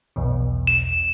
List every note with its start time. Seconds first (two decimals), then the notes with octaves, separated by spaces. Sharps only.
0.16 B1 E2 B2
0.67 E7